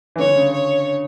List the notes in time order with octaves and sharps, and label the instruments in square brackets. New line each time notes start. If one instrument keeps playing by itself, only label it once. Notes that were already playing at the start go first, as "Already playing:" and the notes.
[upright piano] E3
[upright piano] D3 [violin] C#5
[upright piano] C#3
[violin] C#5